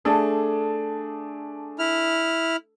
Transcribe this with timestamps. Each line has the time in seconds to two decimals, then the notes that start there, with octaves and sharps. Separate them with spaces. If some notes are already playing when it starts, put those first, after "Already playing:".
0.05 A3 D4 G#4 A4
1.79 E4 F6